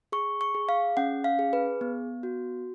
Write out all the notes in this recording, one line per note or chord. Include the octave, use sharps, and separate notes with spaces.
G#4 C#6
C#6
G#4
F5
C#4 F#5
F5
G#4
B4
B3
F#4